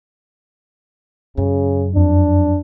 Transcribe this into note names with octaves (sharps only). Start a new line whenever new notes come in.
F#2 C#3
F2 D4